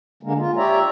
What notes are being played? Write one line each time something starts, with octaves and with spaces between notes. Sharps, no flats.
D3 G#3 A#3
F4
G4 C#5 D5 E5 A#5